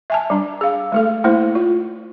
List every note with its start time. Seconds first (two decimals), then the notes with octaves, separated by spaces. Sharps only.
0.10 E5 G#5 A5
0.30 G3 D4
0.61 G#4 F5
0.92 G#3 A3 A4
1.24 A3 A#3 E4 C5
1.55 F4